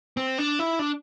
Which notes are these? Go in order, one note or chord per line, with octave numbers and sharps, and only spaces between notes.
C4
D4
E4
D4